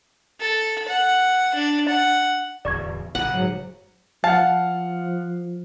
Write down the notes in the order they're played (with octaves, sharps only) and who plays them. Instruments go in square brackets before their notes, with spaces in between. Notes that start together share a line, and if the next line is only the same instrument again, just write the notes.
[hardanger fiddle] A4
F#5
D4
F#5
[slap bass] D1 E2 [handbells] D5 C#6 G#6
[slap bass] F#1 A#2 C#3 [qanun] F#5
[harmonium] G#2 F#3
[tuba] F3 [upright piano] F5 F#5 [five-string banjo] A5